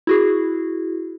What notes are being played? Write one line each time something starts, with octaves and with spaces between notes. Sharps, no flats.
E4 F#4 G#4